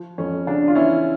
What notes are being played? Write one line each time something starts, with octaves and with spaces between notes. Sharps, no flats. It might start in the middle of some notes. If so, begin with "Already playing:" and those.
Already playing: F3
F2 C#4
C#3 D4
F4
E3 C#4 E4